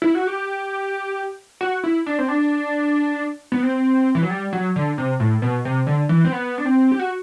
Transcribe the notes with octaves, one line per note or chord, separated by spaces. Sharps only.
E4
F#4
G4
F#4
E4
D4
C4
D4
B3
C4
E3
F#3
G3
F#3
D3
C3
A2
B2
C3
D3
E3
C4
B3
D4
C4
G4
F#4